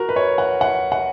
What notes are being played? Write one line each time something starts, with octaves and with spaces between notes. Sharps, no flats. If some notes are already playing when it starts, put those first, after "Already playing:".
Already playing: F#4 A#4
B4
C#5
F#5
F#5
F#5